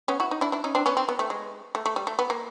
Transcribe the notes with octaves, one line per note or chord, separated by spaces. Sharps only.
B3 C#4
E4 F#4
D#4
D4 E4
D4 E4
C#4 D#4
C4 D4
B3 C#4
C4
B3
A3
G#3
A3
A3
G3
A3
B3
A#3